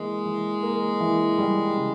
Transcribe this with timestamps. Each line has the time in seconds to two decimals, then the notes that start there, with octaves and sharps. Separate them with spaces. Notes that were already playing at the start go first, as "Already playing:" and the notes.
Already playing: E3 G#3 A#3
0.25 E3
0.63 A#3
1.00 E3
1.38 G3
1.77 C#3